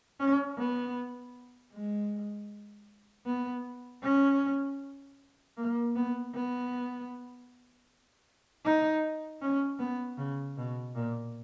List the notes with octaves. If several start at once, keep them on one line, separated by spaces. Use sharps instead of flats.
C#4
B3
G#3
B3
C#4
A#3
B3
B3
D#4
C#4
B3
C#3
B2
A#2